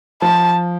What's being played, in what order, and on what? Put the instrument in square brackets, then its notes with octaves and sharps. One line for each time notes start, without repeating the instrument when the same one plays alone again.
[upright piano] F3 [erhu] A5